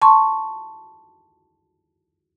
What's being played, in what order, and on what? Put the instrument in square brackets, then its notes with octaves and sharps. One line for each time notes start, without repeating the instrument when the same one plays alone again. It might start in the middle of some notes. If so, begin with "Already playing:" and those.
[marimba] A5 C6 C#6